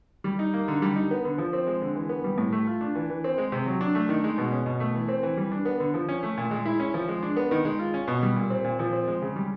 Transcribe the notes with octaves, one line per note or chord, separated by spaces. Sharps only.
G3
D#4
A#3
D3
G3
D#4
B3
D3
F3
C4
G#3
D3
E3
B3
G3
A2
A3
F4
D4
E3
E3
C4
G#3
C3
F#3
D4
A3
D#3
G#3
B2
C#4
B2
A3
E3
C4
E3
G3
D4
B3
D3
F3
C#4
A3
A#2
G#3
E4
C#4
F3
G#3
D4
B3
D#3
G#3
F4
C#4
B2
G3
A#2
C4
A#2
F3
C4
G#3
C#3
G3